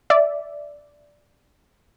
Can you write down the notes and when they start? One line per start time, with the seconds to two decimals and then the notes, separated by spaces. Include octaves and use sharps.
0.10 D5 E5